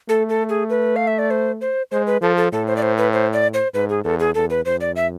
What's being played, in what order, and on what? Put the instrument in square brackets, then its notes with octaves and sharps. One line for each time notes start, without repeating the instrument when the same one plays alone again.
[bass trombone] A3 [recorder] A4
[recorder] A4
G#4
B4
F5
E5
D5
C5
C5
[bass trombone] G#3 [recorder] C5
[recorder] B4
[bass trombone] F3 [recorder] A4
[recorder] A4
[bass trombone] A2 [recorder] A4
[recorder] C5
D5
C5
B4
C5
D5
C5
[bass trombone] G#2 [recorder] B4
[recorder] G#4
[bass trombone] E2 [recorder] A4
[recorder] G#4
[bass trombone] E2 [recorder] A4
[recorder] B4
[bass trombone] F2 [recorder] C5
[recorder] D5
E5